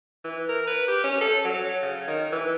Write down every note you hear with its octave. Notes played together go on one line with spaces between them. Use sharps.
E3
A#4
B4
G4
C#4
A4
F#3
C#3
D#3
E3